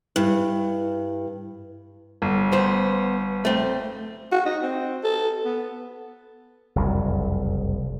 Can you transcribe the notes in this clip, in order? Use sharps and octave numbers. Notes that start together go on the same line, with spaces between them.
G2 E4
G1
B3 C5
A3 C4
F#4
D#4
C4
A4
B3
F#1 C2 F2